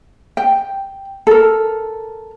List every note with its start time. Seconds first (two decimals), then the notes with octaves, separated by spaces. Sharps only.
0.37 G5
1.27 A4 A#4